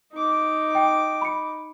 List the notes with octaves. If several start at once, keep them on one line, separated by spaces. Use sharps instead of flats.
D#4 D6
G5
B5 C#7